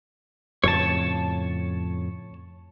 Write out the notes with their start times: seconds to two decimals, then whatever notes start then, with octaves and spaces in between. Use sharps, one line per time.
0.64 F2 A2 C#3 C#5 A5